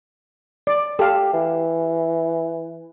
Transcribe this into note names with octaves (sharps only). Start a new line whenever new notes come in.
D5
G4 A4 F5
E3